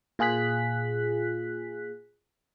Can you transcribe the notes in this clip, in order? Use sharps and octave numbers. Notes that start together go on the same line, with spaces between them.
A#2 F4 G#4 F#6 B6